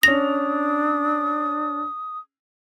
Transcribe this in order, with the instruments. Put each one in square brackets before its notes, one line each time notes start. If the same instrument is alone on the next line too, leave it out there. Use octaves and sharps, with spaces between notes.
[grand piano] C#4 F7 [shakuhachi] D4 [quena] D#6 [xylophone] A#6